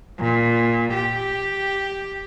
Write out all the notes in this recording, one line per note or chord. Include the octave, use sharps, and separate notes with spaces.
A#2
G4